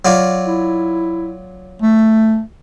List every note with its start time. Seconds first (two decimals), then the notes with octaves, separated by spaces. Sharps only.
0.05 F#3 F4 D5
0.46 E4
1.82 A3